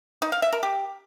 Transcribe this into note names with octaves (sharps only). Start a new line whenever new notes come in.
D#4
F5
E5
A#4
G4